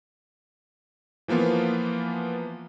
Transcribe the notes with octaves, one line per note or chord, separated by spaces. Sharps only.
E3 F3 A#3 B3 F4